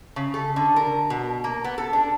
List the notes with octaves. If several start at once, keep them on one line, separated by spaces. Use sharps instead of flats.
C#3
A4
D3
A#4
B2
A#3
B3
A4
D4